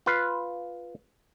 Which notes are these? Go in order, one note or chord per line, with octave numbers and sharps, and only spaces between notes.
F4 B4 F5